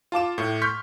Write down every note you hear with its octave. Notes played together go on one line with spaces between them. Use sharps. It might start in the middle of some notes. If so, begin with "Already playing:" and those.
F4 A5 D6 E7
A2
C6 C#6 F6 G6 B6